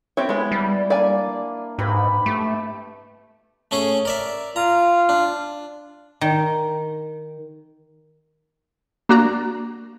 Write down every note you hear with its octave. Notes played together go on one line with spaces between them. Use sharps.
C4 E4 G4 C#5
G#3 B3
G3
A#3 D4 D5 G#5
G#2 G4 B4 B5
A3 G4
A3 C#4 G#4
A#4 D5 E5
F4 A#5
D4
D#3
A#3 D4 F#4 D5 A#5